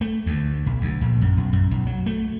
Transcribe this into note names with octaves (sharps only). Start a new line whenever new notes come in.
A3
D2
B1
D2
A#1
F#2
B1
F#2
B1
F#3
A3